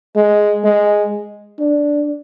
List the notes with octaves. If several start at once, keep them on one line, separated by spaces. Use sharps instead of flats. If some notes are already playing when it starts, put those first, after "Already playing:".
G#3
G#3
D4